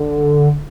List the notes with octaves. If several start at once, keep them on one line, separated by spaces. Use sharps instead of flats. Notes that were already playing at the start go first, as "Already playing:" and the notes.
Already playing: D3